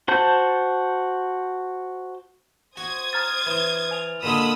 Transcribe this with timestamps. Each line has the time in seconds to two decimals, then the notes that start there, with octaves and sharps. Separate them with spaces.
0.08 F#4 C5 A5 G6
2.77 F#4 C5 D#6 G#6
3.13 A#5 F6 A6
3.46 E3
3.91 G#5 F7
4.23 A#2 D3 G#3 B5 D#6 E6 E7